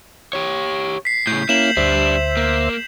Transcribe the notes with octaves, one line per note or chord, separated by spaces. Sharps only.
G4 C#5
B6 C7
A2 C#3 G6
A#3 C#4 E4 E7 F#7
D2 G3 D4 C5 E5
A#3